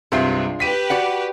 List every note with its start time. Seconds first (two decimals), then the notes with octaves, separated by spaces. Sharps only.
0.12 C2 G2 C3 G#3 D4 F4
0.60 G4 B4 B6 D#7
0.90 F#4 D5 F#5